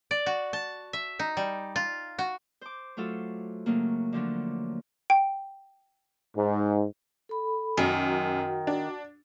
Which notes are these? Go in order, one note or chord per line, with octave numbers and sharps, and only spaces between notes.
D5
F#4
A5
E5
D#4
G3
F4
F#4
C5 D6
F#3 A3 F4 F#4 A4
C#3 F#3 A3 A#3
D3 F3 F#3 D4
G5
G#2
A4 B5
F#2 D#3 F#4 F#5
D4